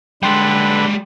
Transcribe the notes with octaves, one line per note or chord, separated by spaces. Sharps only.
D3 G3 G#3 B4 G5 C6 A6